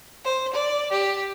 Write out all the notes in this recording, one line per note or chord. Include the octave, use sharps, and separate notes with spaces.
C5
D5
G4